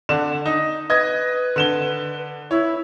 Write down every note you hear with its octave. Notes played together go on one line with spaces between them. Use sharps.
D3 D4 E7
D#4
B4 D#5 G#6
D3 E7 G7
E4 C#5